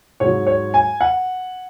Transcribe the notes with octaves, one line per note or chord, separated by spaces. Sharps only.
G#2 F#3 C#5
C#5
G#5
F#5